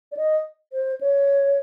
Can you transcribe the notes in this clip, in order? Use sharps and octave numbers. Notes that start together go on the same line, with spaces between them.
D5
D#5
C5
C#5